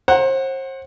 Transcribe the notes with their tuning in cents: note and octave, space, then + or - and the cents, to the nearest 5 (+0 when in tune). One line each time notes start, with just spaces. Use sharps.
C5 +35 F#5 +0 A#5 +0